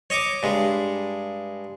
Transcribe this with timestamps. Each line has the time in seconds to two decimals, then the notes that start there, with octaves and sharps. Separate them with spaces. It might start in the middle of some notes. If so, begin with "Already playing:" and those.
0.10 C#5 D#5 C#6 D6
0.43 G2 G#3